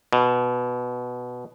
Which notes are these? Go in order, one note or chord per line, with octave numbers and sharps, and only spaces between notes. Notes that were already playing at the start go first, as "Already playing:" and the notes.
B2